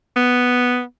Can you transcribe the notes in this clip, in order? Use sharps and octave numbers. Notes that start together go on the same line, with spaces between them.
B3